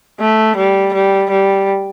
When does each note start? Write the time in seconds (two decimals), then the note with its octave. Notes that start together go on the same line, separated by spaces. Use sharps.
0.21 A3
0.57 G3
0.94 G3
1.30 G3